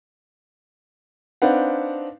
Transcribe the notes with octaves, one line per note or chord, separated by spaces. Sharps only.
C4 D4 D#4 B4 F5 F#5